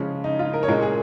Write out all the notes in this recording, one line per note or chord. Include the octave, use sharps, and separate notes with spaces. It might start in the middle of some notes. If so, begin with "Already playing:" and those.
Already playing: C#3 F3 G#3 C#4
D#4
F4
A#4
C#5
A#2 G#3 C#4 A#4
G#4